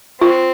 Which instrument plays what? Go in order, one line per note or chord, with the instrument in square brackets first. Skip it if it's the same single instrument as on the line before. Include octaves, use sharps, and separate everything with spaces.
[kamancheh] C4 [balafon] F4